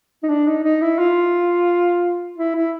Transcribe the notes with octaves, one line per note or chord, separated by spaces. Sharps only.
D#4
D4
D#4
D#4
E4
F4
E4
E4